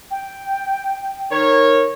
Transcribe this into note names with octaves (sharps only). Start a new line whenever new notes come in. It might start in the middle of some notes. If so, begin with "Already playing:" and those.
G5
D#3 A#4 C#5